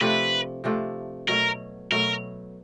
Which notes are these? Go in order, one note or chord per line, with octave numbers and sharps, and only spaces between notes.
C3 F3 A3 D4 B4
C3 F3 A3 D4
B2 F#3 A3 A#4
B2 F#3 A3 A#4